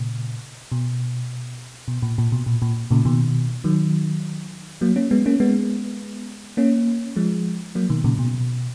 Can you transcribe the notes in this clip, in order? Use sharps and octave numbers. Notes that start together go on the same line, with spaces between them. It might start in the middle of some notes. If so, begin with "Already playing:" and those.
Already playing: A#2 C#3
B2
B2
A#2
A#2
B2
A#2
A#2
A#2 C#3
B2 D#3
D#3 F#3
F#3 A#3
A#3 C#4
G#3 B3
A#3 C#4
G#3 B3
A#3 C#4
F3 G#3
F#3 A#3
B2 D#3
A#2 C#3
B2